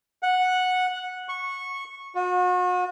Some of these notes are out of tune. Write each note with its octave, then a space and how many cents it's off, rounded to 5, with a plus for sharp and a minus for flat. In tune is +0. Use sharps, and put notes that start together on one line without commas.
F#5 -10
C#6 -15
F#4 -40